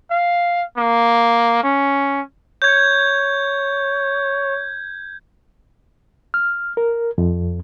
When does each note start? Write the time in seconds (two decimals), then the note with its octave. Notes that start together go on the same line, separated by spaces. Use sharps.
0.11 F5
0.77 A#3
1.64 C#4
2.62 C#5 G6 G#6
6.34 F6
6.77 A#4
7.18 F2